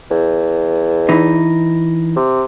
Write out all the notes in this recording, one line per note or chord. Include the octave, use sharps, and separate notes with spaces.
E2
E3 D#4
C3